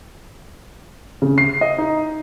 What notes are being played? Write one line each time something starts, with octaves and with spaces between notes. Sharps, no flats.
C#3
C7
D#5
D#4